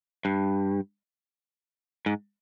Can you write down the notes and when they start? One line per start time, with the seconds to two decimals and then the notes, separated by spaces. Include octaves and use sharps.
0.25 G2
2.06 G#2